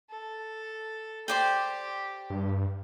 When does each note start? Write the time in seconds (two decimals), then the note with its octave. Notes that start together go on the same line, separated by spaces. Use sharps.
0.10 A4
1.28 G4 C5 D5 G5
2.30 G2